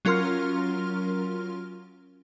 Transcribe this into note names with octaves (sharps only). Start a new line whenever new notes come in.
F#3 C#4 F4 A#4 C6 F6